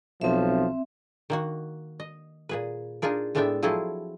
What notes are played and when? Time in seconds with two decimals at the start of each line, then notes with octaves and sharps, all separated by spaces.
0.21 B1 F3 C4 E5
1.30 D#3 A#3 F#4
2.00 D#5
2.49 A#2 G#4 B4
3.02 D4 D#4 F4 G#4 A#4
3.35 A2 G#3 B3 D4 E5 G5
3.63 F3 F#3 C4 E4 G#4 A4